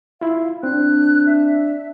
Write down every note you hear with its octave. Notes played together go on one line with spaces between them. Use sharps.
E4 F4 F5
C4 D4 F#6
E5